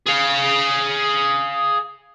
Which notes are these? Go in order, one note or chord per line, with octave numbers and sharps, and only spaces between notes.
G#4 F5